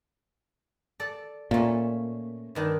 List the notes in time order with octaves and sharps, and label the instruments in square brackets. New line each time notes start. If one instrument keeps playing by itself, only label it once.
[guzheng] A4 D5
[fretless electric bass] A#2 [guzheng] A3 C#4
[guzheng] G2 D#3 D4